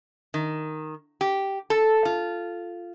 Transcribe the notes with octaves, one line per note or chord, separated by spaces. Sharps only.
D#3
G4
A4
F4